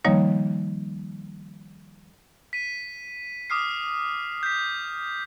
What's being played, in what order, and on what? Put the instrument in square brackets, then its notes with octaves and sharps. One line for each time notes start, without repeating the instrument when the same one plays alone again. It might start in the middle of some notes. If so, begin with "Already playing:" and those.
[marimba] D#3 F3 G3 A#3 D#4 C#5
[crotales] B6 D#7
D6 D#6 F6 C7
G6 B6